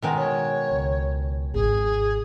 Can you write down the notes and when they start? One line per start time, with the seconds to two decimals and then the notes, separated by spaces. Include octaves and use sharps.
0.03 B2 D#3 G#3
0.17 C#5
0.70 C#2
1.54 G#1 G#4